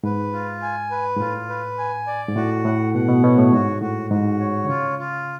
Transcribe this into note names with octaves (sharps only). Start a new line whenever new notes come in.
G#2 B4
F4
G#5
B4
G#2
A2 F4
B4
G#5
D5
G#2
A2 F#4
A2 F#5
B2 F#5
B2
B2 C#5
A2
G#2 F#4
A2 F#4
G#2 F#4
C#5
D3
C#3 F4
F4